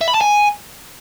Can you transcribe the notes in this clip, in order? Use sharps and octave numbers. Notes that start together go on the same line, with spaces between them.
E5
B5
A5
G#5